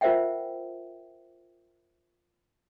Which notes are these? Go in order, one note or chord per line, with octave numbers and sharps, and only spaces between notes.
F4 A#4 C5 E5 F#5 G5